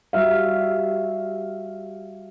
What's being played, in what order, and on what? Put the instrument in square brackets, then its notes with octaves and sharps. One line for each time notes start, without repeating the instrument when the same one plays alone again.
[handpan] G3 F#4 E5 F5